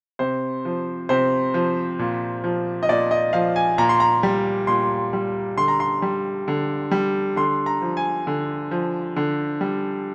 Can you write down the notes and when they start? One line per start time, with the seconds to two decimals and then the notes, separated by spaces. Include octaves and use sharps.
0.19 C3 C5
0.65 F3
1.09 C3 C5
1.54 F3
1.99 A#2
2.44 F3
2.83 D#5
2.89 A#2 D5
3.11 D#5
3.33 F3 F5
3.56 G#5
3.78 A#2 A#5
3.89 C6
4.00 A#5
4.23 G3
4.67 A#2 C6
5.13 G3
5.58 D3 C6
5.68 A#5
5.80 C6
6.02 G3
6.48 D3
6.91 G3
7.36 D3 C6
7.66 A#5
7.82 F3
7.97 G#5
8.27 D3
8.71 F3
9.16 D3
9.61 G3